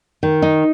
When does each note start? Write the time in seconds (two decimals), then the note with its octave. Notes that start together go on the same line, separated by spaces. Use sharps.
0.23 D#3
0.42 D#4